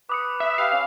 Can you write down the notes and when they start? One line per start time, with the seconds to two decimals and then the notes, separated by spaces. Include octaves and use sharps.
0.09 B4 D6 D#6 C#7
0.40 E5
0.58 G4 B4 E5 F5
0.73 C#4